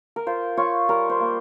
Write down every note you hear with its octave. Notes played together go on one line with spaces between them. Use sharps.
A#4
F4 C5
F4 C#5
G3 A#4
C5
A#3